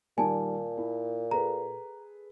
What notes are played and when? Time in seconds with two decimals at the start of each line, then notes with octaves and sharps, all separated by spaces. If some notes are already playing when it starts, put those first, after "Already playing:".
0.18 A#2 D#3 G3 G#5 A5
0.77 E4
1.31 G#4 A4 B4 A#5